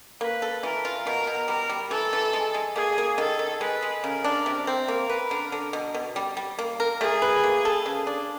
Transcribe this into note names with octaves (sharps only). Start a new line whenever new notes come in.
A#3 B4
A4
E3 A#4
F4
B2 A#4
B2
G3 A#4
G3
E3 A4
E3
G#3
G#3
A#3 G#4
A#3
D#3 A4
D#3
G#3 B4
G#3
C#3 A#4
D4
C3
C4
A#3 A#4
B4
D3
D3
B2
B2
G3
G3
A#3
A#4
A3 G#4
B4
A#3
A4
C#3
D4